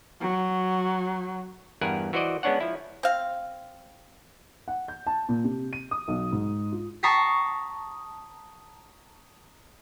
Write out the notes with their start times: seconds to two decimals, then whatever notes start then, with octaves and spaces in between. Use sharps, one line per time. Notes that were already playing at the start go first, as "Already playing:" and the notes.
0.20 F#3
1.81 E2 G2 A#4 B4 F#5 G#5
2.13 E3 F#4 C5 D5 D#5
2.43 G#3 B3 C#4 D4 C#5 F#5
2.60 F3 E4
3.03 C4 F5
4.68 F#5
4.88 G6
5.07 A5
5.29 A#2
5.44 C3
5.73 D#7
5.91 D#6
6.08 B1
6.32 G#2
6.72 F4
7.03 A5 A#5 C#6 D#6 B6 C7